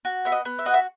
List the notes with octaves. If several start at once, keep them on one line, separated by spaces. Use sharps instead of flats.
F#4
B3 E5
D#5
B3
E5
F#4 D#5
E5